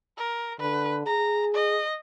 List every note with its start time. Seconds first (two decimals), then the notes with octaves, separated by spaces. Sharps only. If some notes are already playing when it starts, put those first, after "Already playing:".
0.17 A#4
0.60 D3 B4
1.06 G#4 A#5
1.54 D#5